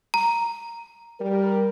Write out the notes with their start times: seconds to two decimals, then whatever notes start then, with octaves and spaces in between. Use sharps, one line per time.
0.14 A#5
1.20 G3 A#4